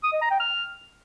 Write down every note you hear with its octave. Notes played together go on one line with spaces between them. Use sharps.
D#6
D#5
A#5
G5
F6